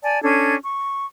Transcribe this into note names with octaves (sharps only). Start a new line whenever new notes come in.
D5 G#5 A5
C#4 D4 A4 G#6
C#6